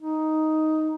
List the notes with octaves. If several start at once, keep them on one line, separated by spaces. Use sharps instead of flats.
D#4